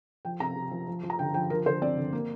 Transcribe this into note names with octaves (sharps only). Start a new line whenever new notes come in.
F3 G5
C3 A#5
C3
F3
F3
F3
A#5
D3 G5
F3 G5
F3 A#4
D3 C5
C4 D5
D3
A#3